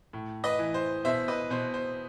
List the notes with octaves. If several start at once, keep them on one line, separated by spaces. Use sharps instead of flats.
A2
B4 D#5
E3
C5
B2 C5 E5
B4 D#5
B2 C5
C5